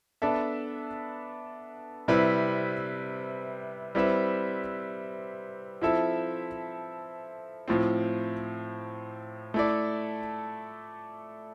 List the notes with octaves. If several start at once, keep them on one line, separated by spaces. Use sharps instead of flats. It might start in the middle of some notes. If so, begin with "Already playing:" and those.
B3 D4 A4 E5
C3 G3 C4 E4 B4
G3 C4 E4 B4 E5
F3 C4 E4 A4 E5
A2 F3 C4
A3 E4 A4 D5